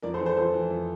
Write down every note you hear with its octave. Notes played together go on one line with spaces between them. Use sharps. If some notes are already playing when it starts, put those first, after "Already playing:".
F2 A#4 D5
A4 C5
E3
A4 C5
F2 A4 C5
E3
F2